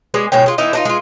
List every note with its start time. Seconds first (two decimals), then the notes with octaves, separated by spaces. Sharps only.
0.14 G#3 B3 G#4 D5
0.32 B2 G#3 C#5 G5
0.46 G#3 F4
0.58 E3 B3 D#4 E4
0.73 D4 D#4 F4
0.85 G#3 F4